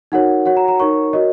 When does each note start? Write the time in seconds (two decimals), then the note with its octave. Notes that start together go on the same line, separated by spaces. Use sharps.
0.12 D#4 F#4 A#4 C#5 F#5
0.46 F#4 C#5 F#5
0.57 A#5
0.68 A#5
0.80 D#4 A#4 C#5 C#6
1.13 F#4 A#4 C#5 D#5